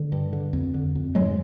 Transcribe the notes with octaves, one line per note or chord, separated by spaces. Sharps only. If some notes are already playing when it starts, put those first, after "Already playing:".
Already playing: D3
G2
D3
F2
D3
F2
G#2 F#3 G#3